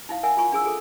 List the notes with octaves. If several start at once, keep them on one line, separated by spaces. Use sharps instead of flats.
D#4 E4 F5
A#4 E5 F#5 G#5
F4 G#5 C#6
D4 G#4 E6
G#4 A4